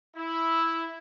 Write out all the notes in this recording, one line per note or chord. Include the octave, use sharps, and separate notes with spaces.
E4